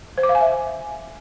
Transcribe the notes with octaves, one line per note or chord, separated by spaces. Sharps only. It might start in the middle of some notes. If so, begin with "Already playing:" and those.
C5
D6
F5
G#5
E5